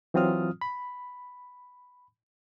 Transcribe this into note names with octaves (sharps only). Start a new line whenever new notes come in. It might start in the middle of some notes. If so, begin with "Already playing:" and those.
E3 F#3 C4 F4 D#6 F6
B5